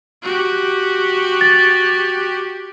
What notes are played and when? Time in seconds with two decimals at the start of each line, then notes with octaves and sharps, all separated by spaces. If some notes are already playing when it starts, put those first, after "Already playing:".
0.23 F#4 G4
1.41 A6